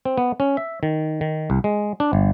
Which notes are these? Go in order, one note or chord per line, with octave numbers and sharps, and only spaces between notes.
C4
B3
C#4
E5
D#3
D#3
C2
G#3
D4
G1